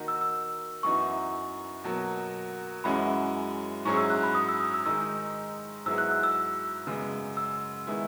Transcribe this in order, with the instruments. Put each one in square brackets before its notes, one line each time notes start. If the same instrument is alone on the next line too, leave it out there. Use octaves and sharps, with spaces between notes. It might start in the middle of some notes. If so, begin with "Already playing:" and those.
Already playing: [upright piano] D#3 A#3 D#4 F#4
[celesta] E6
E6
[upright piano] F#2 E3 B3 D#4 F#4 [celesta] C#6
[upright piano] B2 F#3 A#3
[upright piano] F#2 E3 G#3 C#4 F#4 [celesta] B5
[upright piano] G#2 F#3 C#4 E4 G#4 [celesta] C#6
[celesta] E6
F#6
B5
D#6
E6
D#6
E6
[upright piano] D#3 G#3 D#4 [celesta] E6
[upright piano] G#2 F#3 B3 E4 G#4 [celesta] E6
[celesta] F#6
E6
E6
[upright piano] F#2 C#3 G#3 B3
[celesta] E6
[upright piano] D#3 G#3 B3 E4